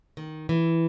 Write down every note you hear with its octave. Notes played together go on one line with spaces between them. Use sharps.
D#3
E3